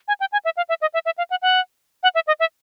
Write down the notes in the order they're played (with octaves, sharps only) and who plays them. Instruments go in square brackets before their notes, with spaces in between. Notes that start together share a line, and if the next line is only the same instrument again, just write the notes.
[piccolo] G#5
G5
G#5
E5
F5
E5
D#5
E5
E5
F5
F#5
F#5
F#5
E5
D#5
E5